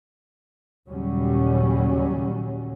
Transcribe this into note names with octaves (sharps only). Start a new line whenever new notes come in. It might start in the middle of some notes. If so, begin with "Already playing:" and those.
D#2 A#2 C#3 F#3 G3 C#4